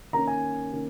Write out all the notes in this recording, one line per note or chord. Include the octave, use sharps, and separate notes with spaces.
D#3 A#3 C#4 A#5
G#5
D#3 A#3 C#4